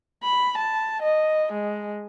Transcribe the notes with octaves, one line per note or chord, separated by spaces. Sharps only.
B5
A5
D#5
G#3